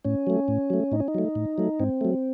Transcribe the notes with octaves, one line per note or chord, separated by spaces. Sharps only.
A2 C#4
F#3 A3
A2
F#3 A3
A2 D#4
C#4
D#4
F#3 A3
A2
F#3 A3
G#2 C4
F#3 A3